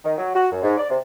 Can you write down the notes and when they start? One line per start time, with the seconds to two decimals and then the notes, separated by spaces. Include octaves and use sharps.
0.04 D#3
0.18 F#3
0.34 F#4
0.51 F#2
0.63 G#2
0.78 D5
0.90 C3